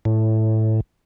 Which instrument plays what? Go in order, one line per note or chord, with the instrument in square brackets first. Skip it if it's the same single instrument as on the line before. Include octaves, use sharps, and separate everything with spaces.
[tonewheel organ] A2